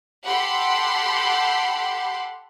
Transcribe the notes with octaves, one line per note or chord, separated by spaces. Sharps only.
G4 A4 F#5 B5 C6 C7